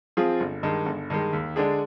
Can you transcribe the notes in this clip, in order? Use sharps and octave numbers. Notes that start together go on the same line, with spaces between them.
F3 C4 F4 G#4
G1
G2 D#3 G#3
G1
G2 D#3 G#3
D#2
D3 G#3 D4 G#4